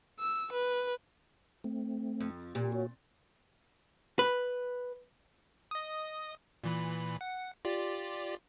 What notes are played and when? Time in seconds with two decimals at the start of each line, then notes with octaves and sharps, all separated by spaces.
0.20 E6
0.53 B4
1.64 A3 C4
2.20 F2
2.55 A#2 G4
2.72 F#4 C#5
4.19 B4
5.71 D#5 D#6
6.64 A#2 E3 B5
7.21 F#5
7.65 F4 G4 D5